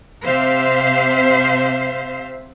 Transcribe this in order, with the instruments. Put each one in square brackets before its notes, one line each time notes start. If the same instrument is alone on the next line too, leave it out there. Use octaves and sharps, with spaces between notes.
[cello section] C3 C5 E5 F5